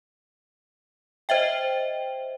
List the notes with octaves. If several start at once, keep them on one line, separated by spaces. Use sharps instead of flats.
C5 D#5 E5 G5